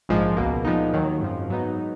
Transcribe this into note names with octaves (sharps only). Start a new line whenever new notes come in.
A#1 G#2 F3 G#3
C#2 B2 A#3
A#2 F3 G#3 B3 D#4
D#2 D#3 F#3
G#1 F#2 F3
G#2 F#3 B3 D#4